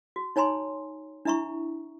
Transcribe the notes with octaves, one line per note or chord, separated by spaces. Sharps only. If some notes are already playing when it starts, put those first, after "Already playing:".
F#4
D#4 C#5 G#5 A#5 C6
D4 E4 E5 A#5 C#6